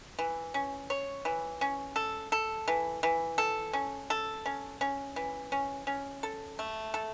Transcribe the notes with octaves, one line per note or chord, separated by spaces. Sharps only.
E3
C#4
C#5
E3
C#4
A4
A4
E3
E3
A4
C#4
A4
C#4
C#4
E3
C#4
C#4
A4
A3
A4